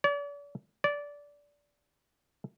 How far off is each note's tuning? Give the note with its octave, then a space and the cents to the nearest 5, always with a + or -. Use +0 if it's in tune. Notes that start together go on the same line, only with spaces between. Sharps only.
D5 -40
D5 -15